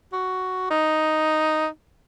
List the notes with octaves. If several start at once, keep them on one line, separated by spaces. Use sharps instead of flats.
F#4
D#4